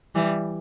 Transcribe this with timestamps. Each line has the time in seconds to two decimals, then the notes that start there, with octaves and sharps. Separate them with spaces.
0.15 E3 G3